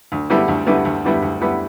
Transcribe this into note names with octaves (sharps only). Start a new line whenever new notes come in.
D2
D3 G3 B3 E4
D2
D3 G3 B3 E4
D2
D3 G3 B3 E4
D2
D3 G3 B3 E4